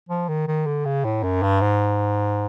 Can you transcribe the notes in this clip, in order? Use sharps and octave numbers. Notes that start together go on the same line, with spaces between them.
F3
D#3
D#3
D3
C#3
A2
F#2
G2
G#2